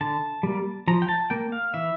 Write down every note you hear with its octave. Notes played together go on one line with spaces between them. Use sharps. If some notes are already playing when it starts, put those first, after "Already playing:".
D3 A5
G3 A#3
F3 A#5
G5
A5
A#3 G5
F5
E3 E5